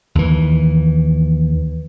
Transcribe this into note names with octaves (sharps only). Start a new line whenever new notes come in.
D#2 E3